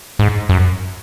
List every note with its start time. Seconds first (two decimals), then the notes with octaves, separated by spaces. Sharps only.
0.19 G#2
0.49 F#2